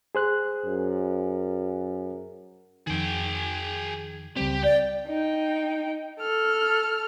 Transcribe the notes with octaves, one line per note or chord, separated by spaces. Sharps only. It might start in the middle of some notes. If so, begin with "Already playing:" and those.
G#4 C5 F#6
F#2
F2 D#3 G#4 G5
C#2 G3 C4 G4
D5 G5
D#4 G5
A4 F6